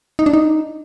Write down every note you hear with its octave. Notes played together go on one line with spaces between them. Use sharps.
D#4
D4
D#4